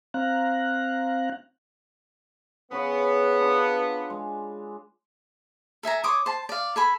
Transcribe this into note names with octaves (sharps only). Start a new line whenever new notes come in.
C4 F5 A#5 F#6
C#3 B3 B4 C#5
D4 F4
G#3
A4 E5 G#5 A#5
C#5 C6 D6 D#6
C5 A5
D5 F5
A4 G#5 B5